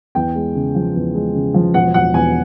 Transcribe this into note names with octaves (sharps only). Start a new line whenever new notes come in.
E2 G5
G#3
C#3
F3
E2
G#3
C#3
F3
E1 F#5
E1 F#5
E2 G#5